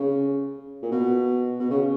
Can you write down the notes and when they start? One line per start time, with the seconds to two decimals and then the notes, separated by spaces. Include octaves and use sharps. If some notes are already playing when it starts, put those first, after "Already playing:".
Already playing: C#3
0.83 A#2
0.92 B2
1.60 B2
1.70 C#3